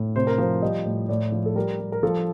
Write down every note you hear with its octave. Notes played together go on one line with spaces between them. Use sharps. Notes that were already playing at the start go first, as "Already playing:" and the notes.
Already playing: A2
C3 C5
A#4
F3 C5
G3 D#5
A2
A2 D5
F3
A4
G3 A#4
G3
A#4
F3 A4